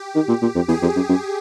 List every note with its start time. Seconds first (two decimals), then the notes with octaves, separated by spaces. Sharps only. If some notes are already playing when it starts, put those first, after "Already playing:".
Already playing: G4
0.15 D#3
0.29 A#2
0.42 A#2
0.55 F2
0.69 E2 G#4
0.82 F2
0.96 F#2
1.09 F#2